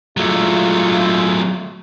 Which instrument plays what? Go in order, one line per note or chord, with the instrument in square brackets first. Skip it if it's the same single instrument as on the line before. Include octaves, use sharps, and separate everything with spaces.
[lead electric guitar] F#3 A3 [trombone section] G#3 E4 F4